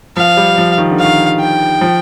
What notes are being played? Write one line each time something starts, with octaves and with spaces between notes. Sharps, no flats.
F3 F5
G3
F3
D#3
D3
D#3 F5
G5
F3